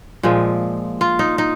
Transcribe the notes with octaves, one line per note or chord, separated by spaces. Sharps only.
A#2 F3 G#3
F4
D#4
D#4